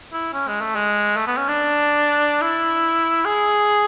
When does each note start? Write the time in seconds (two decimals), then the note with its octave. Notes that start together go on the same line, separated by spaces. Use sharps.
0.13 E4
0.34 C#4
0.48 G#3
0.61 A3
0.76 G#3
1.17 A3
1.27 B3
1.37 C#4
1.48 D4
2.42 E4
3.25 G#4